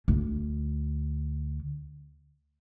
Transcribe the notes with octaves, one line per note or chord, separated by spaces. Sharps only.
D2 D3